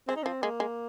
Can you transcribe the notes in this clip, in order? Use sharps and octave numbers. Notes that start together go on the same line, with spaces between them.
G#3 C4
D#4
F3 C4
G#3 A#3
G#3